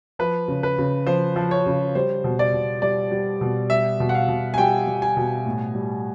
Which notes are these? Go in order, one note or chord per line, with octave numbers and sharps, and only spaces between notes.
F3 B4
C#3
B4
C#3
F3 C5
F3
C#5
C#3
G3 C5
B2
D5
B2
G3 D5
G3
B2
G3 E5
B2
F#5
F5
B2
G#5
G3 G5
G3
G#5
B2
A2
G3